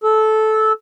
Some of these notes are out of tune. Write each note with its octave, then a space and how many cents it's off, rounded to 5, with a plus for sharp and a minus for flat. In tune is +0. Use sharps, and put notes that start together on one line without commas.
A4 -15